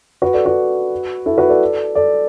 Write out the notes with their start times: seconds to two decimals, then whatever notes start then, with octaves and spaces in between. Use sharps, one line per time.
0.22 F#4 B4
0.33 A4 D5
0.45 F#4 B4
1.26 E4 A4
1.38 F#4 B4
1.49 A4 D5
1.95 A4 D5